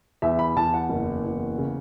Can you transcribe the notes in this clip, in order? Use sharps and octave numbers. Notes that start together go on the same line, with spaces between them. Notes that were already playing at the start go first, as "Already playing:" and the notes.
E2 E5
B5
E2 A5
F#5
F#1
E2
C#3